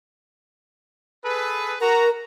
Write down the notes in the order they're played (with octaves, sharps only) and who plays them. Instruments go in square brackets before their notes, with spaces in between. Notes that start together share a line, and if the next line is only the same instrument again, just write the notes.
[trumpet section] G#4 A4 B4
[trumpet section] F#4 A#5 [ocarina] A#4